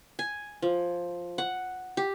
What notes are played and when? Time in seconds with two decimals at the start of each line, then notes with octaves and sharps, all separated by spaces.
0.19 G#5
0.62 F3
1.38 F#5
1.97 G4